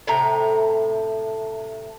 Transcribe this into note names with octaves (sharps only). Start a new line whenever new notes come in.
A2 C3 A#5